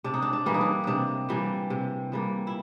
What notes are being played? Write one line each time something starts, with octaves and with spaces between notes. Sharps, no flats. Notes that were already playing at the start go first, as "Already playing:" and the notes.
C3 D4
D#4
D4
D4
E3 G3 A#3
D#4
D4
C3 D4 D#4
E3 G3 A#3
C3
E3 G3 A#3
E4